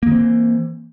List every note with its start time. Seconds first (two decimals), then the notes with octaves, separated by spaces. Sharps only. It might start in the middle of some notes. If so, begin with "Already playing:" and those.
0.03 A#3
0.07 D#3
0.11 C4
0.16 E3